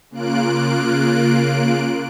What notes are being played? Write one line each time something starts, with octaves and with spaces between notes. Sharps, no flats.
C#3 A#3 F4 F#6 D7